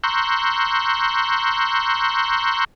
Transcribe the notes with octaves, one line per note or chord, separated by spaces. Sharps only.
A#5 C6 C#6 E6 F#6 G6